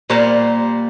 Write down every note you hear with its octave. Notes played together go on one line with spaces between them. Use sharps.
A#2 G3 A#3 C5